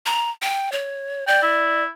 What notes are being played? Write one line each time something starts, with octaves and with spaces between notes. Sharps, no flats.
A#5
G5
C#5
D5 G5
E4